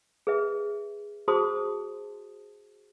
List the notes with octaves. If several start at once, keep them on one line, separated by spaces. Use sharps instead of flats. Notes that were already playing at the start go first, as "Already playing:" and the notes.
G#4 B4 E5
F#4 G#4 C5 A5 C6 D#6